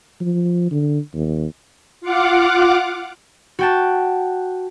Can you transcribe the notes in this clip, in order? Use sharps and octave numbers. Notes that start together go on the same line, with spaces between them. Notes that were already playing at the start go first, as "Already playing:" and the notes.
F3
D3
D#2
F4 F5 F#5 D6
F#4 G5 A5